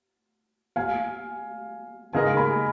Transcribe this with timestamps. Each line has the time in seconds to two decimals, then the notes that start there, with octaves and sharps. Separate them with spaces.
0.76 F5 G#5
2.13 C#3 G#3 D#4 A#4 D#5 F5 G#5
2.37 G#5 B5